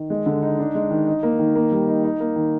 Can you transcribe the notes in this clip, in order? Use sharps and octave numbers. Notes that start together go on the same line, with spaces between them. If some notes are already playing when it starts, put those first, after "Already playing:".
Already playing: D#3
G#3
D3
D#4
D4
G#3
D#3
D#4
A#3
D#3
A#3
G3
D#4
D#4
A#3
D#3